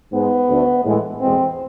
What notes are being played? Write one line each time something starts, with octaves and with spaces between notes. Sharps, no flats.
G#2 G#3 B3
D2 D3 A3
A2 E3 G#3
E2 B2 G#3 C4